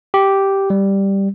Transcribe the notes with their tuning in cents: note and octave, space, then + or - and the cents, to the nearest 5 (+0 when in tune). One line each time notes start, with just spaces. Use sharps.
G4 -5
G3 +0